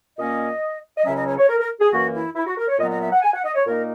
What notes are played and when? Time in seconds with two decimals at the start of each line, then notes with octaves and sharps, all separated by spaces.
0.18 A#2 A#3 C#4 D#5
0.98 D#5
1.05 C#2 C#3 F#3 C#4 E5
1.16 D#5
1.26 C#5
1.37 C#5
1.49 A#4
1.59 A#4
1.80 G#4
1.91 F#2 E3 A#3 F#4
2.14 E4
2.35 E4
2.46 F#4
2.58 A#4
2.68 C#5
2.78 A#2 F#3 B3 D#5
2.89 D#5
3.00 E5
3.12 F#5
3.22 G#5
3.33 F#5
3.44 D#5
3.55 C#5
3.65 A#2 A#3 D#4 A#4